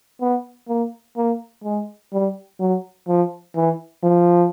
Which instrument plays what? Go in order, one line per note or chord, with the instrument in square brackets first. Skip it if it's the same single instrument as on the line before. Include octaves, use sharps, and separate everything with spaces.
[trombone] B3
A#3
A#3
G#3
G3
F#3
F3
E3
F3